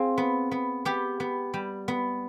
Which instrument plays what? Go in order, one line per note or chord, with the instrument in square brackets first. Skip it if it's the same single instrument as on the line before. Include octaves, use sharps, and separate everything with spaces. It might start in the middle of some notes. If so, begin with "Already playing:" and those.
Already playing: [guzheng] C4 F4 G#4
B3
B3
B3 G4
B3
G3
B3